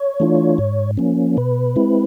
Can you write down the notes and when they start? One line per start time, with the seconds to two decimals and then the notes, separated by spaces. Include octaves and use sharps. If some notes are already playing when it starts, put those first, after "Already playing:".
Already playing: C#5
0.20 E3 A3 D4 F4
0.58 G#2
0.97 F3 A#3 C#4
1.37 B2 B4
1.76 G#3 C4 E4